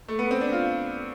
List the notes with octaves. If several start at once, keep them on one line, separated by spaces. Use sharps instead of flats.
A3
B3
C4
D4
F4